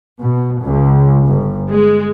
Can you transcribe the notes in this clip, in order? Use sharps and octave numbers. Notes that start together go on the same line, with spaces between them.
B2
C#2
G1
G#3